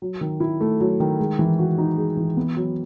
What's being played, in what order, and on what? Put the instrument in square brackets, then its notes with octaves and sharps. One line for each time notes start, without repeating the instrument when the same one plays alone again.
[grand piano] F#3
D#3
E4
A3
F#3
D#3
G#3
E3
F#4
D#4
G#3
E3
B3
F#3